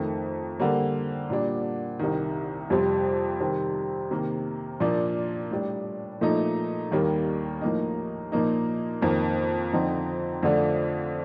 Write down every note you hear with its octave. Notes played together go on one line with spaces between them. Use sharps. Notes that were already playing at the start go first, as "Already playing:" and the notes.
Already playing: F2 D#3 A3
D3 G3 A#3
A#2 G3 D4
C2 C3 D#3
F2 C3 G3 C4
C3 D#3 G3 C4
C3 D#3 A#3
A#2 F3 A#3 D4 F4
A2 G3 D4
A#2 F3 A3 D#4
D#2 D#3 G3 A#3
A2 F3 A#3 D#4
A#2 F3 A#3 D#4
F2 D#3 A#3
F2 D3 F3 C4 D#4
F2 D3 A3 D4 F4